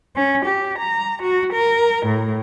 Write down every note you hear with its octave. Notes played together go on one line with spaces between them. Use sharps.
C#4
G4
A#5
F#4
A#4
A2